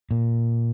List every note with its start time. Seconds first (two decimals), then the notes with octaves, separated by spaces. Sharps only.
0.11 A#2